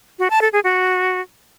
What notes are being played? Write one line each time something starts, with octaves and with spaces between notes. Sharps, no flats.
F#4
A5
A4
G#4
F#4